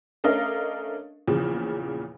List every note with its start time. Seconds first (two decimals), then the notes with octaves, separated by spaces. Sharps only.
0.24 A3 C#4 D4 A#4 D#5 F5
1.28 E2 A#2 C#3 F3